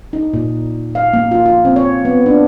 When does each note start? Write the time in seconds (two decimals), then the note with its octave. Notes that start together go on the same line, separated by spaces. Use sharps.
0.13 D#4
0.34 A#2
0.95 F5
1.13 A#3
1.31 F4
1.46 F4
1.65 C4
1.76 C#5
2.05 B3
2.26 D4